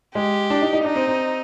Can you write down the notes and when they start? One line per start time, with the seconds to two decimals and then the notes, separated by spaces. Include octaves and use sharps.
0.15 G#3 G4
0.50 D4
0.62 D#4
0.73 D#4
0.84 D4 D#4
0.96 C4
1.07 C4